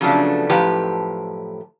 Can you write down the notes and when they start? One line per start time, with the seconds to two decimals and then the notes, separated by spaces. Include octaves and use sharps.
0.01 C#3 F3 F#3 A3 B3 D4
0.49 F#2 A2 F3 G4 B4